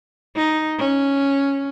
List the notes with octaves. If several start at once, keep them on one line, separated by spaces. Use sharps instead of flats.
D#4
C#4